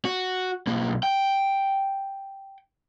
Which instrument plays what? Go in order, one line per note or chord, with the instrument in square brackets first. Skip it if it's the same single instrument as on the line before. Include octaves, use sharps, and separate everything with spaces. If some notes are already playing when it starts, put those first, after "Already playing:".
[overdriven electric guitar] F#4
B1 A#3
G5